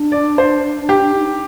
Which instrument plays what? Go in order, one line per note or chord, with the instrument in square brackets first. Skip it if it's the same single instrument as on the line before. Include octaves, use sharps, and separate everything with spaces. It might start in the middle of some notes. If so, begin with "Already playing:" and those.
Already playing: [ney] D4
[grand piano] D5
C5
G4
[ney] D#4